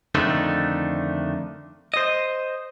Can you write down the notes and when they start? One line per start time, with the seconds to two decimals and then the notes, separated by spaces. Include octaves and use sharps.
0.15 F2 D3 D#3 A3 D4 D#4
1.94 C5 D#5